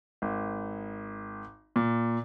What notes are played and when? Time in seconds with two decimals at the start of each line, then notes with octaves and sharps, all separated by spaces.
0.22 G#1
1.76 A#2